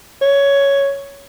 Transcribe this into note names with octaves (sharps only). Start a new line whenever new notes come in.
C#5